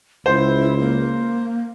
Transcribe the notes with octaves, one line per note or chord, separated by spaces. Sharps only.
C#2 E4 C5
A#3